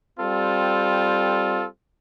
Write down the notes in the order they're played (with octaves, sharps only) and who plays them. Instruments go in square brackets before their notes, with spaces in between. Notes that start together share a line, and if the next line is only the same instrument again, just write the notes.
[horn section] G3 C4 F4 A4